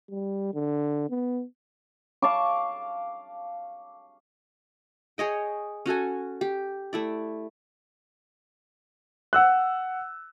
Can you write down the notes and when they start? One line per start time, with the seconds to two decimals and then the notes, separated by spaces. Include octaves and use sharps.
0.10 G3
0.53 D3
1.10 B3
2.22 F5 A5 C#6 D6
5.18 G#4 C#5 D#5 G5
5.86 C#4 F#4 A4 G#5
6.41 G4
6.93 A3 E4 D5
9.33 F#5 E6 F#6